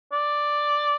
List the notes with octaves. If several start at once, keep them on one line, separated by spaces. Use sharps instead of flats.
D5